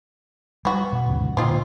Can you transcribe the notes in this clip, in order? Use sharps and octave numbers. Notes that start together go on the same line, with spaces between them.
G3 B3 F#4
B2
D2 G#2 C#3
A#2 D3 C4 F4 D#5